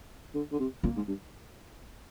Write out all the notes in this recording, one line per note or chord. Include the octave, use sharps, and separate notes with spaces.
D3
D3
C3
A#2 A#3
G#2
G2